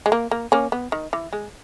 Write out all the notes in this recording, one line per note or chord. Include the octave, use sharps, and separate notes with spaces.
G#3
A#3
A#3
A#3 C#4
B3
D#3
E3
G#3